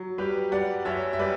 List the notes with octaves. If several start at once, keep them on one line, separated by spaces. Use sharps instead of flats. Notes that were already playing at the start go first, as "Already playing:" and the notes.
Already playing: F#3
G3 G4 B4
G3 D5 F#5
F#2 C#5 E5
E5
G3 B4 D5